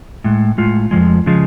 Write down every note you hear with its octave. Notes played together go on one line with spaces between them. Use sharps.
A2 G#3
A2 G#3 F4
F2 C#3 F3 G#3
C#3 F3 G#3